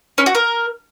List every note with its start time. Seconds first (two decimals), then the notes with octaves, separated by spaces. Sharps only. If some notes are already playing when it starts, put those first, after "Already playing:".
0.18 C#4
0.26 F#4
0.35 A#4